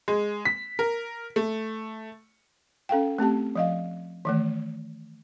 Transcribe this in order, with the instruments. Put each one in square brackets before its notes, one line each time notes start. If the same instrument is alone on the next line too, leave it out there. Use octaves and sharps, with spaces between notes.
[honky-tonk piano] G#3
B6
A#4
A3
[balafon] C#4 A4 F5 G5
A3 C4 G4 A5
F3 D#5 F5
D#3 E3 A3